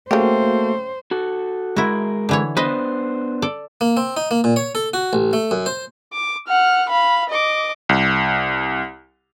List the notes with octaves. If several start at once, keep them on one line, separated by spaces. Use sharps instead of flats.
C#3 A3 A#3 F#4 G4 C5
F#4 A4
G#3 E4 F#4 A#4
D3 E3 C#5
B3 D4 B4 C5 D#5
A4 D5
A#3
C4
D#4
A#3
A#2
C#5
A4
F#4
A1
A3
F#2
C5
D6
F#5 F6
F5 B5
D#5 D6
C2